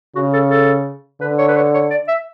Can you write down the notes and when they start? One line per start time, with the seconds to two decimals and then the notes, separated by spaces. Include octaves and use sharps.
0.15 C#3 F#4
0.33 A4
0.51 A4
1.21 D3 B4
1.38 C#5
1.48 B4
1.56 C#5
1.74 C#5
1.90 D5
2.08 E5